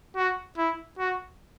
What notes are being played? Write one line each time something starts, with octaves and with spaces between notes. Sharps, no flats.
F#4
E4
F#4